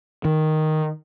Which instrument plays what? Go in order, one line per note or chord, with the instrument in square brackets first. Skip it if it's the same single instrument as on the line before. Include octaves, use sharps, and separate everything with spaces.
[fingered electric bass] D#3